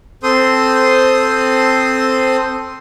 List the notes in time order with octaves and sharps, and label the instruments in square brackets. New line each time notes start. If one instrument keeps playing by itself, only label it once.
[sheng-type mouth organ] C4 A4 C5 C6 D#6